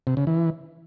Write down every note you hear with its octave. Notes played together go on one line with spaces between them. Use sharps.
C3
C#3
E3